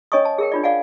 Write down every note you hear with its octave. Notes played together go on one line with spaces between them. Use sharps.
C#4 C#5 D#5 G#5 C#6 D#6
A5
G#4 A#4 G5
D4 F4 D5
D5 F5 F#5 G#5